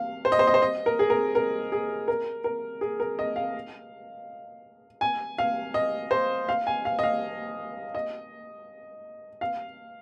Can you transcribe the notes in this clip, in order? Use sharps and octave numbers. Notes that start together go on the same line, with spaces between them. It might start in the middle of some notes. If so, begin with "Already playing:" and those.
Already playing: F5
C5
D#5
C5
D#5
C5
D#5
A#4
G#4
A#4
A#4
G#4
A#4
A#4
G#4
A#4
D#5
F5
G#5
F5
D#5
C5
F5
G#5
F5
D#5
F5
D#5
F5